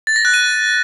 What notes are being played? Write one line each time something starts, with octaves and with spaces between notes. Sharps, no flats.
A6
A#6
F#6
D#7